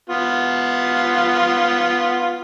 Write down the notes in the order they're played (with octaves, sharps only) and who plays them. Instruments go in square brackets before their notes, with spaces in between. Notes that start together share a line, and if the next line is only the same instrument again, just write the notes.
[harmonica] B3 F4